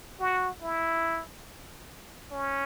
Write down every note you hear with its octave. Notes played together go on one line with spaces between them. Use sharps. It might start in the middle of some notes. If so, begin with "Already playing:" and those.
F#4
E4
C#4